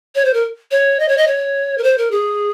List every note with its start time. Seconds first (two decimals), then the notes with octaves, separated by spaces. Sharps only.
0.15 C#5
0.25 C5
0.34 A#4
0.71 C#5
0.99 D#5
1.08 C#5
1.17 D#5
1.27 C#5
1.78 A#4
1.84 C5
1.98 A#4
2.11 G#4